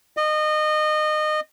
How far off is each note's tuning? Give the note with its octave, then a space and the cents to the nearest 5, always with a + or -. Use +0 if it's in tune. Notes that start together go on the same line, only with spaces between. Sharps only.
D#5 -25